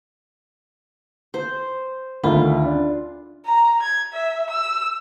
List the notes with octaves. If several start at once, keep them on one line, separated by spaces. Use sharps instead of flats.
C5
D2 D#3 F4 B5
D4
A#5
G#6
E5
E6